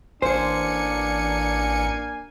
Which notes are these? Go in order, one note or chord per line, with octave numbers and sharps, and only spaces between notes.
A1 A#3 D4 C5 F5 G#5 C#7